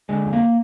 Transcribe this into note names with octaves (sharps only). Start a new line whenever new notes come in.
D3 G#3
F2
A#3